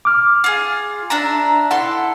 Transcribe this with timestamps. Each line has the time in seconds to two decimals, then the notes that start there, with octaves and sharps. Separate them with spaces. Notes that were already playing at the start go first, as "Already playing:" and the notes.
0.05 D6 F6
0.44 F4 G#4
1.10 D4 E5 A#5
1.71 E4 A4 F#5 C6